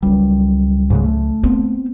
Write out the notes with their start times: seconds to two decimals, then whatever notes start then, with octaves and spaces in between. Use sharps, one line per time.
0.03 C#2 F#3 G3
0.90 G#2 C#3 G#3
1.04 A3
1.43 B3 C4